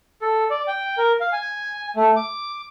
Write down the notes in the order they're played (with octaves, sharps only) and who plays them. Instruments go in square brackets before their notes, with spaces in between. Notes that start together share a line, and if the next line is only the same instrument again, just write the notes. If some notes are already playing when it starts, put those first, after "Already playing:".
[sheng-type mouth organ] A4
D5
G5
A#4
F5
G#5
A3
D6